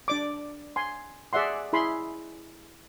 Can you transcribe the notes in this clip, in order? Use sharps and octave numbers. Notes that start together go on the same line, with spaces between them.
D4 D5 D6
G#5 C6
G#4 D5 E5 F#5 C6
E4 G#4 B5 C6